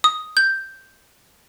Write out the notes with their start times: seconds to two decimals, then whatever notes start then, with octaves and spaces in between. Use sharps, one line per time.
0.04 D#6
0.37 G6